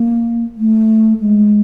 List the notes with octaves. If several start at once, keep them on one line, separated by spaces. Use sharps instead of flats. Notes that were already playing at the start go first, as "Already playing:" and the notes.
Already playing: A#3
A3
G#3